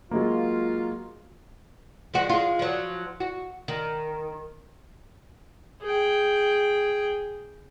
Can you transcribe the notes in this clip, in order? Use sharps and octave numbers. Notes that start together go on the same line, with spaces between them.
F#3 G#3 A#3 F4
F3 G#3 F#4
G#3 F4
F3 F#3
F#4
D#3
G#4 G5